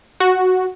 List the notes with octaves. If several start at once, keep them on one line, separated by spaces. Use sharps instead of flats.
F#4